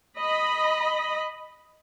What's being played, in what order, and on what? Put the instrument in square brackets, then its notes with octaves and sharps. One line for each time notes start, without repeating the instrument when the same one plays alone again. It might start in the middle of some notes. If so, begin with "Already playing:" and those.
[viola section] D#5 B5